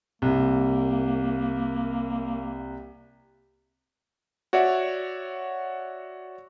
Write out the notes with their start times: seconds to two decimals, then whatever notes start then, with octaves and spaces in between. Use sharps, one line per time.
0.22 C2 A#3
4.53 F#4 C#5 D5 E5 F#5